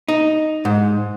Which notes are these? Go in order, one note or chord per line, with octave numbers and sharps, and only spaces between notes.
D#4
G#2